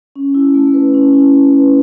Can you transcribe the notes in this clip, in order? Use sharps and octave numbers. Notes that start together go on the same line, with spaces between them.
C#4
E4
A3
B4
C#4
E4
A3
B4